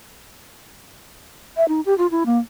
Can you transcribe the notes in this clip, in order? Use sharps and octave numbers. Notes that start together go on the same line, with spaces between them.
E5
D#4
G4
F4
E4
A#3